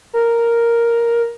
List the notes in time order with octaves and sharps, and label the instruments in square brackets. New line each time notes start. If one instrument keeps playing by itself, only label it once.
[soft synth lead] A#4